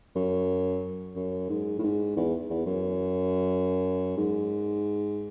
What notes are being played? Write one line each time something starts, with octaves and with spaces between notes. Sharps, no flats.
F#2
F#2
G#2
A2
G#2
E2
E2
F#2
G#2